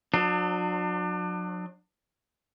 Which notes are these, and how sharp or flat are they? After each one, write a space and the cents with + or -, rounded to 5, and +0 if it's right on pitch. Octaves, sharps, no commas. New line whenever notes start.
F#3 -35 D4 +30